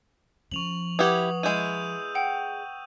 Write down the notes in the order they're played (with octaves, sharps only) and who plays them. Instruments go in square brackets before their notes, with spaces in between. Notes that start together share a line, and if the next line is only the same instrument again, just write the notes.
[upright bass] F3 C#4 [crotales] C#6 F7 F#7
[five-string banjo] E4 G4 [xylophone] B4 F#5 G#6 [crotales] D#6
[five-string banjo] G#3 E4 [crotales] E6 G6 D#7
[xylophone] F#5 G5